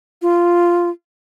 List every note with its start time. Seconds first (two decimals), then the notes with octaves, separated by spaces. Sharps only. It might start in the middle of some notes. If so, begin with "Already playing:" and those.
0.22 F4